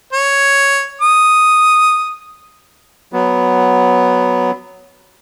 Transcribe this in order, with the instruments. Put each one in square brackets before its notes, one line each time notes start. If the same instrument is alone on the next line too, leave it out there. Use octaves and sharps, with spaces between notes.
[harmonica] C#5
D#6
[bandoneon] F#3 B3